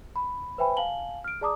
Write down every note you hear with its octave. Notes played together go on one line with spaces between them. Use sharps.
B5
B4 C5 E5 G5 G#5 B5
F5 G#5 A5 F#7 G7
F6 D7
G#4 D5 A5 A#5 D6 D#6